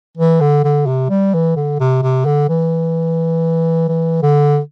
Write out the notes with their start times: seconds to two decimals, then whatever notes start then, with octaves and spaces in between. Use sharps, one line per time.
0.17 E3
0.41 D3
0.64 D3
0.86 C3
1.10 G3
1.34 E3
1.56 D3
1.80 C3
2.02 C3
2.25 D3
2.49 E3
3.88 E3
4.22 D3